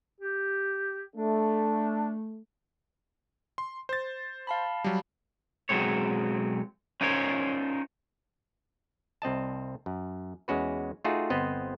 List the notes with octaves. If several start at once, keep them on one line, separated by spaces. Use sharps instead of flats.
G4
A3 D4
C6
C5 A6
F5 A5 B5
F#3 G3
B1 F#3 G#3 C4 C#5
C#4 D#4 F4 A#4 C5 C#5
C2 C4 D#5 A5
F#2
E2 G#3 C#4 F#4 B4
A3 D#4 F4 F#4 G#4
G1 B3 C4 C5 D#5